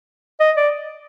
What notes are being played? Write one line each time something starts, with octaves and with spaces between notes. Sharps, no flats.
D#5
D5